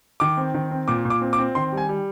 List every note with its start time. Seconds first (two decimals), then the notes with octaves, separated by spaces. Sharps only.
0.20 D#3 D6
0.37 C4
0.54 D#3
0.71 C4
0.88 A#2 D6
1.05 A#2
1.10 D6
1.22 C4
1.33 D6
1.38 C4
1.55 D#3 C6
1.72 G3
1.77 G#5
1.89 G3